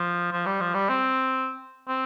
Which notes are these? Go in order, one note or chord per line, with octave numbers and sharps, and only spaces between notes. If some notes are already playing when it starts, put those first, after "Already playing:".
Already playing: F3
F3
G3
F3
G3
C4
C4